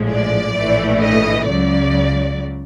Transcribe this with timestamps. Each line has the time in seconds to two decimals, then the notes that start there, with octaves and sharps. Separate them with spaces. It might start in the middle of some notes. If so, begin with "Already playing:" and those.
Already playing: A#1 A2 F3 G#3
0.10 D5
0.56 A#1 A2 E3 A3
1.02 D#5
1.48 C#2 C#3 F#3 D5